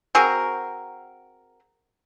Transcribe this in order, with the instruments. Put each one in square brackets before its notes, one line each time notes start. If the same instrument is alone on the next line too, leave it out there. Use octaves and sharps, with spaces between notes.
[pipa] C4 F#4 G#4 A#4